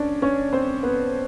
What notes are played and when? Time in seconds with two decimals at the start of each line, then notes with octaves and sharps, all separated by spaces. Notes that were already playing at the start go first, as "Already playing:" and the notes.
Already playing: C#4 D4 D5
0.22 C#4 C#5
0.53 C4 C5
0.83 B3 B4